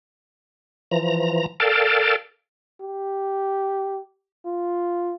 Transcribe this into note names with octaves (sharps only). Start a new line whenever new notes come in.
E3 F3 A#5
A4 A#4 D5 F5 G5 A5
G4
F4